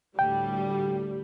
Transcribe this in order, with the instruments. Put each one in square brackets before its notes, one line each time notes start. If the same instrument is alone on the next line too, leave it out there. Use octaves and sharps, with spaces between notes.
[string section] D2 A2 G3 [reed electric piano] G5